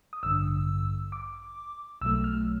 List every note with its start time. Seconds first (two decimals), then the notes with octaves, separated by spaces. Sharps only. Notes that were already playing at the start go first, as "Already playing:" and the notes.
0.13 D#6
0.23 A1 G2 D3 E6
1.12 D6
2.01 B1 B2 F#3 A3 E6
2.24 F6